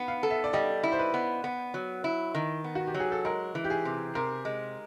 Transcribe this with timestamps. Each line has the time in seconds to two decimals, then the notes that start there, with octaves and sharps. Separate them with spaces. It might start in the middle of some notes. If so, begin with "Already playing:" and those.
Already playing: B3 F#5
0.08 F5
0.23 A4
0.30 E5
0.44 D5
0.53 G3 D#5
0.83 E4
0.92 C5
0.99 B4
1.14 B3
1.44 B3
1.74 F#3
2.04 E4
2.35 D#3
2.64 B3
2.75 F#4
2.87 G4
2.94 F#3
3.00 G#4
3.12 A4
3.25 G#3 A#4
3.55 E3
3.64 G4
3.70 G#4
3.85 C3
4.15 C3 A#4
4.45 G#3